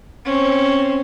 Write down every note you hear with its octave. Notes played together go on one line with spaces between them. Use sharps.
C4 C#4